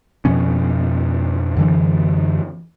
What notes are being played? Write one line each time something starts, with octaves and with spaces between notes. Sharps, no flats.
F2 B2 F3 C#4
F#2 D3 E3